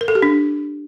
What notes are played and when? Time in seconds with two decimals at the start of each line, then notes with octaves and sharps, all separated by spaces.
0.01 A#4
0.08 A4
0.15 G4
0.22 D4